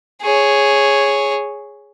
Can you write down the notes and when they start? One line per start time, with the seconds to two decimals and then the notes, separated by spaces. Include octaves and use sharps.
0.22 G#4 C#5